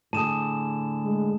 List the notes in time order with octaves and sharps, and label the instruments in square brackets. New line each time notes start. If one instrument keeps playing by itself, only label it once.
[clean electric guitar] A2 D3 G#4 [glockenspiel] A5 E7
[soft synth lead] G#3